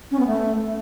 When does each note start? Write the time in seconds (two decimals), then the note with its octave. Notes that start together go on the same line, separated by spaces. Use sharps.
0.11 C#4
0.19 B3
0.27 A3